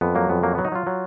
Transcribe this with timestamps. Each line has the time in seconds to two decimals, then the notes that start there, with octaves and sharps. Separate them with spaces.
0.01 F2 B3
0.15 F#3 A#3
0.29 F2 B3
0.43 F#3 A#3
0.55 F#3 B3
0.65 D#4
0.72 F#3 F4
0.87 F#3